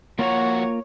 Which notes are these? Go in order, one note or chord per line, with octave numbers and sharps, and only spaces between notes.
F3 A#3 F4 F#4 C#5 A#5